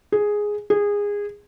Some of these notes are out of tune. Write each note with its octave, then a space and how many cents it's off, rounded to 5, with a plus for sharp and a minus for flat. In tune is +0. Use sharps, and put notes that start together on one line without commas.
G#4 +0
G#4 -20